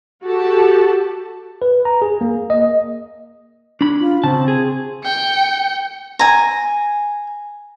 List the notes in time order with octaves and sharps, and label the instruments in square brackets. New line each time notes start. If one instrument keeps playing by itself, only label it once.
[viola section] F#4 G4 A4 A5
[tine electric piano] B4
A#5
G#4
A#3
D#5
[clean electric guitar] D4 B5
[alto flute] F4
[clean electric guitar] C#3 A5 [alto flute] C4
[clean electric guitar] G#4
[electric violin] G5 C#7
[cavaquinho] G#5 A#5